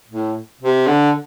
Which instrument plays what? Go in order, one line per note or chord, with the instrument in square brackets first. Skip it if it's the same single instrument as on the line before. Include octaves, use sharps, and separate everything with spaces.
[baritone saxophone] A2
C3
D3